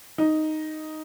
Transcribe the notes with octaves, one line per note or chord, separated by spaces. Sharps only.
D#4